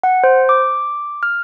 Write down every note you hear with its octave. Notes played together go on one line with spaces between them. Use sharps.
F#5
C5
D6
F6